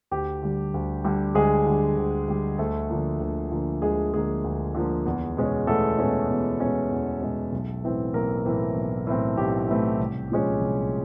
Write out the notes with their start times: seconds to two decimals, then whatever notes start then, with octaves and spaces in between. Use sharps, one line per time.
0.11 D2 G4
0.42 D3 G3
0.74 D2
1.04 D3 G3
1.35 D2 G#3 G#4
1.66 D3 G3
1.97 D2
2.28 D3 G3
2.58 D2 A3 A4
2.89 D3 F3 A#3
3.20 D2
3.52 D3 F3 A#3
3.82 D2 G#3 G#4
4.13 D3 F3 G#3 A#3 G#4
4.44 D2
4.75 D3 F3 A#3
5.06 E2
5.37 B2 G#3 C#4
5.67 E2 A3 A4
5.99 B2 G#3 C#4
6.29 E2
6.60 B2 G#3 C#4
6.91 E2
7.22 B2 G#3 C#4
7.52 B1
7.83 A2 E3 A3 C4
8.14 B1 A#3 A#4
8.45 A2 E3 A3 C4
8.76 B1
9.07 A2 E3 A3 C4
9.37 B1 G4
9.69 A2 E3 A3 C4
10.00 C2
10.31 A#2 F3 G#3 C#4
10.61 C2